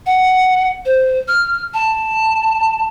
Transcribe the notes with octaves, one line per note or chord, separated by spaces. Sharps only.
F#5
C5
F6
A5